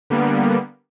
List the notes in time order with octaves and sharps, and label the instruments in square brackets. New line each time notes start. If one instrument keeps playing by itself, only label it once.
[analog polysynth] D3 G3 A#3 B3